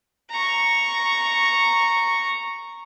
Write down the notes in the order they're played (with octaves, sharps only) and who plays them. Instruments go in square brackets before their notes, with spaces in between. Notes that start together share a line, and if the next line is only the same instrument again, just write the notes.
[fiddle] A#5 C#6